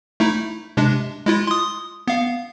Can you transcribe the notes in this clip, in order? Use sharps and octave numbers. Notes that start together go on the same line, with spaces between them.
A3 D#4 E4
C3 G#3 D4
G#3 E4 F4
C6 D#6
B3 F5